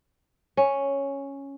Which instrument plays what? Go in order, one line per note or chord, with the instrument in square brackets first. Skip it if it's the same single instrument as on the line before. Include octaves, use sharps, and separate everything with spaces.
[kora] C#4